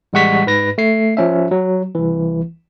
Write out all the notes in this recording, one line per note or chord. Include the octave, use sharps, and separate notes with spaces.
A1 G3 G#3 F#5 C#6 B6
G#2 B4 A#6
A3 C7
F3 C#4 E5
F#3
C2 E3